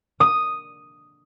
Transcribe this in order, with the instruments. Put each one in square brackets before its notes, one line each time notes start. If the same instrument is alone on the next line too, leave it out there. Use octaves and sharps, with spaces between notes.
[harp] D#6